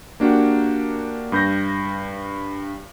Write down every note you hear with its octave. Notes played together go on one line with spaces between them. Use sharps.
A#3 D4 F#4 G4
G2 G6 A#6